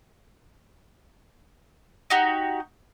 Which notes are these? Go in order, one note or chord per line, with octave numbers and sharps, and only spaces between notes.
D#4 F#4 G4